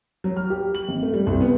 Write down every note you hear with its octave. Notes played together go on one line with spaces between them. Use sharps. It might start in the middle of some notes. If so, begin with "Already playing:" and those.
F#3
F6
G4
F#7
G#1
A3
G3
C2
B3